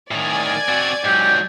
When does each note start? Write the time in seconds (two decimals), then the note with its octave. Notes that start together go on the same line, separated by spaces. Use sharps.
0.11 A2 D#3 D5 G#5 G#6
0.69 C4 F#4
1.04 G#2 F#3 G4